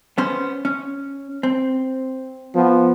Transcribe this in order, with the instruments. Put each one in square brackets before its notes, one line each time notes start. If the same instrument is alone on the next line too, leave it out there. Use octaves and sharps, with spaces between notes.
[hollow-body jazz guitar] B3 C#4 C5
C#4
C4
[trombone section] F3 B3